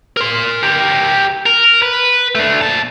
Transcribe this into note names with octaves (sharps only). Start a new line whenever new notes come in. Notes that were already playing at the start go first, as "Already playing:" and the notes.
A#4 C6
G4 A#4
A#4
B4
A3 D4
A#2 A5